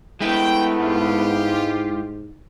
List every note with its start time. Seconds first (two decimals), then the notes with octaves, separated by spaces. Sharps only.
0.21 G#3 A3 B3 E4 G5
0.80 G#2 F4 G4